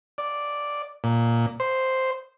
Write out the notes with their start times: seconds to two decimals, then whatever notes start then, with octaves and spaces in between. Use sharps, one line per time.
0.18 D5
1.04 A#2
1.60 C5